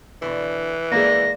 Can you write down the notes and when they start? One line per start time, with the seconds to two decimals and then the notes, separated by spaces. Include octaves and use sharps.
0.22 B2 D3 E3
0.92 G#3 A#3 D5 A#6